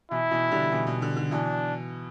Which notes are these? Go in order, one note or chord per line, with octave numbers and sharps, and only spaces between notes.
B2 E3 E4
B2 E3
D3 G3
B2 E3
B2
D3
D3
B2 E3 D4